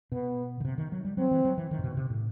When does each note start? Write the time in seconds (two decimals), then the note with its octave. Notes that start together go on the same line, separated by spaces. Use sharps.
0.12 B2 B3
0.60 D#3
0.65 C3
0.78 D#3
0.92 F#3
1.05 G3
1.17 F#3 C4
1.31 E3
1.45 F#3
1.58 E3
1.71 D#3
1.79 A2
1.84 B2
1.97 C3
2.10 A2